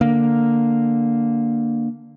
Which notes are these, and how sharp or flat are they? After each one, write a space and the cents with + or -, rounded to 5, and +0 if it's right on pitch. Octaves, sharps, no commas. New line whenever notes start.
D3 +0 A#3 +0